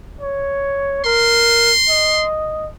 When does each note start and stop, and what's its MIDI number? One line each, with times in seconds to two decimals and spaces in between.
0.21 1.04 73
1.05 1.72 70
1.05 2.25 84
1.89 2.67 75